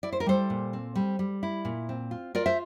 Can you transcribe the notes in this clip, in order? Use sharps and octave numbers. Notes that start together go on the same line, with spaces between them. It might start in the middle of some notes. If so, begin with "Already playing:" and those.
E4 D5
C5
A#4
G3 A4 C5
A#2
C4
G3
G3
E4
A#2
C4
F4
F4 A#4 D5
C5 E5